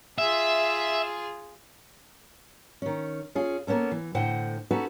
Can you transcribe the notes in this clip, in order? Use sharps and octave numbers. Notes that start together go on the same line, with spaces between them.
F4 G#4 E5
D#3 C#4
C#4 F4 G#4
A#3 B3 C#4 A4
E3
A2 D3 C5 F#5 G5
C#4 D#4 F#4 A4 B4